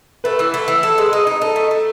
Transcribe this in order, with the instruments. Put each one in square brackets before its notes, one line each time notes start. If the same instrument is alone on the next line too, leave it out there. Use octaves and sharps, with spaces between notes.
[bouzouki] A3 [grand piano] B4
[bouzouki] E3
A3
E3
A4
G#3
D#4
D#4
[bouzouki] D#4 [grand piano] A4
[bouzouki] A3
A3